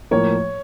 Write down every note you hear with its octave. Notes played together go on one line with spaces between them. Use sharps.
A2 F3 A#3 C#5